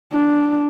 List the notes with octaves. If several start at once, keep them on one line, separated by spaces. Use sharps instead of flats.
D4